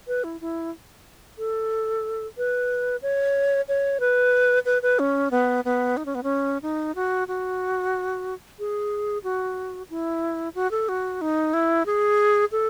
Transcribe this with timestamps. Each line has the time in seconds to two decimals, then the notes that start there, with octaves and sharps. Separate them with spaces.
0.08 B4
0.24 E4
0.41 E4
1.38 A4
2.37 B4
3.02 C#5
3.68 C#5
4.00 B4
4.65 B4
4.82 B4
4.99 C#4
5.31 B3
5.65 B3
5.97 D#4
6.06 C#4
6.15 B3
6.23 C#4
6.62 D#4
6.95 F#4
7.28 F#4
8.59 G#4
9.24 F#4
9.90 E4
10.55 F#4
10.71 A4
10.89 F#4
11.21 D#4
11.54 E4
11.86 G#4
12.52 A4